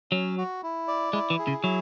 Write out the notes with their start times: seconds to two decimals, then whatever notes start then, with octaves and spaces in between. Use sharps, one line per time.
0.11 F#3 C#4
0.38 F#4
0.63 E4
0.88 D5
1.13 G#3 E4
1.30 E3
1.39 G#4
1.47 C#3
1.64 F#3 E4